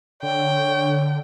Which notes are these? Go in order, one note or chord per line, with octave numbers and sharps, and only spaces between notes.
D3 C#5 G5